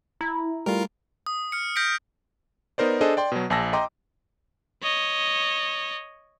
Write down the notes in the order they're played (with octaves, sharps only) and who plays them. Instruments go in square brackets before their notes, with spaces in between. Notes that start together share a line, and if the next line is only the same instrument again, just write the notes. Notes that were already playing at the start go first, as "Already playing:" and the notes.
[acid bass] E4 [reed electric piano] A#5
[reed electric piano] G3 A3 [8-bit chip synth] F4 A#4
[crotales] D#6
F6 C#7
F6 G6 A#6 B6 D7
[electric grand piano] B3 D#4 A#4 C5 D5
D4 G#4 A4 C5 D#5
D5 G5 C6
B2 F#3
A#1 G#5 A5 E6 A#6
D#5 G5 A#5 C6 D6
[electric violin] C#5 D#5